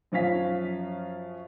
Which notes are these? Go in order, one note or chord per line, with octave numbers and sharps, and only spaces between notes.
F#2 F3 C#4 F5 B6